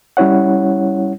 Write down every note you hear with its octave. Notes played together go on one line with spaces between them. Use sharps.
G3 C#4 E4 C#5 F#5